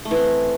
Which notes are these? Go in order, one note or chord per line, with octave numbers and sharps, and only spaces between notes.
A3
E3
C4